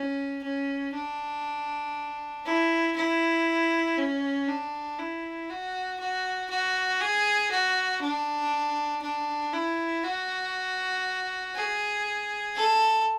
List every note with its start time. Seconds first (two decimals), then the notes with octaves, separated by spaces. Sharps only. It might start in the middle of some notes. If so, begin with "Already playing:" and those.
Already playing: C#4
0.43 C#4
0.94 D4
2.46 E4
2.96 E4
3.97 C#4
4.48 D4
4.98 E4
5.49 F#4
5.99 F#4
6.50 F#4
7.01 G#4
7.51 F#4
8.02 D4
9.02 D4
9.53 E4
10.03 F#4
11.55 G#4
12.56 A4